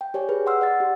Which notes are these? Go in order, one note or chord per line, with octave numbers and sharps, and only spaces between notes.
G5
G4 C#5 D5 G#5
G#4 B4
F#5 C6 E6 F6
D5 F#5 A6
G4